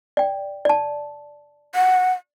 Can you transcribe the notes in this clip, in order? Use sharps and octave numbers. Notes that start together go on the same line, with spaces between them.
D5 G5
D5 A5
F#5